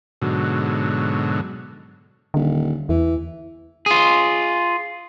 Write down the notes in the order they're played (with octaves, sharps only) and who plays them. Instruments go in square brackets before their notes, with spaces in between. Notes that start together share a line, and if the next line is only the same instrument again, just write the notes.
[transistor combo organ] G#2 B2 D3 F#3
[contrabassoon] D#1 [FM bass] D3
[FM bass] E2 [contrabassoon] E3
[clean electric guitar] F4 G#4